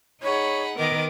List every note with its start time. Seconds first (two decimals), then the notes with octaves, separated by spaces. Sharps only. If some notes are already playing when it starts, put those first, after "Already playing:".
0.23 D#4 G#4 C#5 F#5 B5
0.79 D#3 B3 A#4 D#5 D6